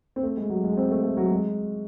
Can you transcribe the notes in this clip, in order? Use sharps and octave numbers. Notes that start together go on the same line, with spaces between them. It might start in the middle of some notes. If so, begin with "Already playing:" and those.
C4
A3
G#3
F#3
G#3
C4
A3
A3
F#3
G#3